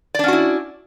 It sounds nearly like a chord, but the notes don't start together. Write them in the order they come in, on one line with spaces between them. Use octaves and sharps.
D5 D4 C#4 F#4 E4